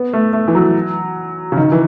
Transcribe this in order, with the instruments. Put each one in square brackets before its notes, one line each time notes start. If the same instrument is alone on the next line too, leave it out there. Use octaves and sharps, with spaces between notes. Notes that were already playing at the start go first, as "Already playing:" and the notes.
Already playing: [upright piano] B3
A3
A3
E3
F#3
C#3
D#3
E3